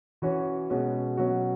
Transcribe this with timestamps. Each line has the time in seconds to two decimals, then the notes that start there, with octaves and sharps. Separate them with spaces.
0.22 E3 C#4 F#4 C#5
0.70 B2 G#3 C#4 F#4
1.17 B2 F#3 C#4 F#4